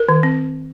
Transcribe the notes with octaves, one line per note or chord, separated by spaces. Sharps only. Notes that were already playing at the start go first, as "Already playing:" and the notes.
Already playing: A#4
D#3
C4